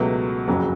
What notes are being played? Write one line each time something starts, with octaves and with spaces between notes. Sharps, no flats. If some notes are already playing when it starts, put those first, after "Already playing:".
Already playing: C#2 B2 F#3 A3
F#1 F2 C#3 F#3